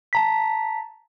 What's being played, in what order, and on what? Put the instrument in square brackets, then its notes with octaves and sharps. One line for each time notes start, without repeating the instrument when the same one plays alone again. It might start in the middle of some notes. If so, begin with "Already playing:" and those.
[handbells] A5 A#5 B6